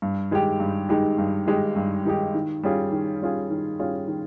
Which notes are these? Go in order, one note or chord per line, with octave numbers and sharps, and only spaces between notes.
G2
D#3 G#3 D#4 G4
G2
D#3 G#3 D#4 G4
G2
D#3 G#3 D#4 G4
G2
D#3 G#3 D#4 G4
D#3
G3 C#4 F4 G#4
D#3
G3 C#4 F4 G#4
D#3
G3 C#4 F4 G#4
D#3